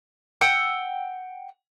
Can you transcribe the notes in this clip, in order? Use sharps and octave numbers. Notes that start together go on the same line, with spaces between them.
F#5 G5 E6